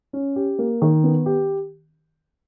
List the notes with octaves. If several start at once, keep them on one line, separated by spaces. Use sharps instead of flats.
C#4
G4
A#3
D#3
B3
G4